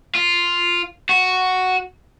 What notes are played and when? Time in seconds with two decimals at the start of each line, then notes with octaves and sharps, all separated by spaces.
0.15 F4
1.09 F#4